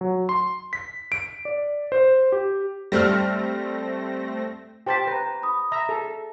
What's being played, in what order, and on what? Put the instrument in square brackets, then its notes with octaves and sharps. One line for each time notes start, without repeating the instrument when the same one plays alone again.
[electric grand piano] F#3
C6
B6
D7
D5
C5
G4
[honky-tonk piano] G3 F6 [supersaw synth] A3 C4 A#6
[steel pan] G4 C5 A5 [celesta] G5 B6
[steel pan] B4 [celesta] A#5 A#6
[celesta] B5 D#6
[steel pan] E5 A#5
[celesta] G#4 [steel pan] A4